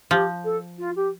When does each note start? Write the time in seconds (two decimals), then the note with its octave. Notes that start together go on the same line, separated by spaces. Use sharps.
0.11 F3 G4
0.44 A4
0.79 F4
0.96 G4